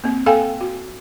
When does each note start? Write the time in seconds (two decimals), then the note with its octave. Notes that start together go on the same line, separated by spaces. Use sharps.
0.04 A#3 C4
0.26 A4 F5 G5 G#5
0.61 F#4